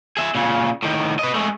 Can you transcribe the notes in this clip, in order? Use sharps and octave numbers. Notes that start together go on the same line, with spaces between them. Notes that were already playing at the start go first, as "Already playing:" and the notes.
G#4 E5
A#2 C#3
A2 D#3
B4 D#5
G#3 A3